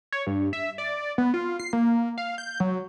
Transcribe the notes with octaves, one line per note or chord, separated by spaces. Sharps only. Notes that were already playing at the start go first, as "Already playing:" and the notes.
C#5
G2
E5
D5
B3
F4
C7
A#3
F5
G6
F#3